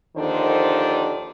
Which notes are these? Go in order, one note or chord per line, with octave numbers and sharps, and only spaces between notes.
D#2 D3 D#3 F3 D4 C5